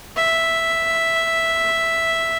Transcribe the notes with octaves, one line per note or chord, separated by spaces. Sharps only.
E5